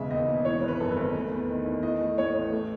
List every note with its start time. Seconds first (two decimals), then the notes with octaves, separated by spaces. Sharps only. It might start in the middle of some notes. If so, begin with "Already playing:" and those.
Already playing: E1 C#3 G#3 E5
0.10 D#2 D#5
0.28 E1
0.45 E3 C#5
0.62 G#1
0.68 B4
0.80 F#2 A4
0.91 B4
0.97 G#1
1.15 A3
1.31 E2
1.49 D#3
1.66 E2
1.83 E3 D#5
2.01 A3
2.18 A2 C#5
2.35 A1
2.53 A3